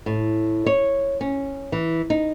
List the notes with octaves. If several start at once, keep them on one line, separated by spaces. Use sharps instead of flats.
A2
C#5
C#4
E3
D#4